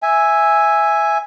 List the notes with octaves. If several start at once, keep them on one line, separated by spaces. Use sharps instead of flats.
E5 G#5